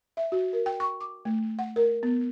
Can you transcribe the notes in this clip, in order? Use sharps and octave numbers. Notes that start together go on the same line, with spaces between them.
E5
F#4
A#4
G5
C#6
D6
A3
F#5
A#4
B3